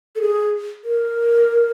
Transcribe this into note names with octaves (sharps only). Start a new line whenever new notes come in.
A4
G#4
A#4